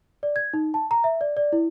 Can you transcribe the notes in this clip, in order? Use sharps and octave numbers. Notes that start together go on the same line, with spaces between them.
D5
G#6
D#4
A5
A#5
E5
D5
D5
E4